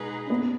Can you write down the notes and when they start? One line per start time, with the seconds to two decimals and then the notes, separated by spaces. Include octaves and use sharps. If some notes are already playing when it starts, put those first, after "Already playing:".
Already playing: B2 G#3 D#4 G#4 B4
0.26 C#4
0.30 B3